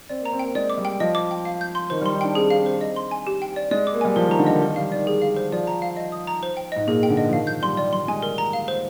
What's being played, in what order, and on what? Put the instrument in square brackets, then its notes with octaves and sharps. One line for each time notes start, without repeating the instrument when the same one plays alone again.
[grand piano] C4 [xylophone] D5
[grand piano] A#3 [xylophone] A#5
[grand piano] C4
[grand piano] A#3 [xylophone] G5
[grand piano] G#3 [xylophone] D5
[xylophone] D6
[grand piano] G3
[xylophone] G5
[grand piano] F3 [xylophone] D#5
[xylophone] D6
G5
F5
G6
C6
[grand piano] D#3 [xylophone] C5
[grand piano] G3 [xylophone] C6
[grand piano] D#4
[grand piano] D4 [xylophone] G5
[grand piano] C4 [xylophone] G#4
[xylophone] F5
[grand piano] C4
[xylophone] C5
D#5
C6
G#5
G4
G5
D5
[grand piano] G#3 [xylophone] D5
[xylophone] D6
[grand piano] A#3
[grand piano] G3 [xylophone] G#5
[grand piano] F3 [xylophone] A#4
[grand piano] D#3 [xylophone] A#5
[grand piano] D3
[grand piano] D#3 [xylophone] D#5
[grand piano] D#3 [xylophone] A#4
[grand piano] G3 [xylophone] F5
[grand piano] D#3 [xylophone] D5
[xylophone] G#4
F5
C5
[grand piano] F3 [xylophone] D5
[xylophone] A#5
F5
D#5
D#6
A#5
C5
G5
[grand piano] G#2 [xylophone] D#5
[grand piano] A#2 [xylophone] G#4
[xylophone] G5
[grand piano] D3
[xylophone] D#5
[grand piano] F3
[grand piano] D#3 [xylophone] F5
[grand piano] F3 [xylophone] G6
[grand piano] G3 [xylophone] C6
[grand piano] G3 [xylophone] D5
[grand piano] G3 [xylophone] C6
[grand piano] G#3 [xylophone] G#5
[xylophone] A#4
A#5
F5
C5